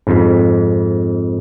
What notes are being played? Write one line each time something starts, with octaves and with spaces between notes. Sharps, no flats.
F2 G#2